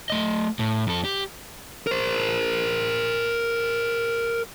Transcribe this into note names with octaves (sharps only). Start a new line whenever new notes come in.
A3 D#5
A2
F2 A4
G4
A#4 C5